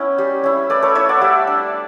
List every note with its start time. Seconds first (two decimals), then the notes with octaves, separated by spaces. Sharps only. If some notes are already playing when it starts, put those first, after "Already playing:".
Already playing: B3 C#4 E4 G5
0.18 G3
0.44 C#4 E4
0.70 A3 B4 D5
0.82 A4 C#5
0.95 E4 C#5 E5
1.09 D5 F#5
1.21 G3 E5 G5
1.47 D4